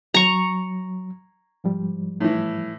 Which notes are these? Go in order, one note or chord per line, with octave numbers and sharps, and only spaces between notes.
F#3 A#5 C#6
G#2 F3 G3
A2 E3